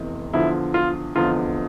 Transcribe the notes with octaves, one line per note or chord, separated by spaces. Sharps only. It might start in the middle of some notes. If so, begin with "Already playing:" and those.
Already playing: F1 E2 C3 E3
E2 D3 F3 E4
F4
F1 E2 D3 F3 F4